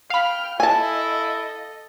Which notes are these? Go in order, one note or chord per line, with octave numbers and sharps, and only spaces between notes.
F5 G5 B5 F6
E4 A4 D#5 G#5 A5